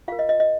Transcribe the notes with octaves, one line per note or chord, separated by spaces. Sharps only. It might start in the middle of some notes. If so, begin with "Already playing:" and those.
F4 A#4 F5
D#5
D#5
D#5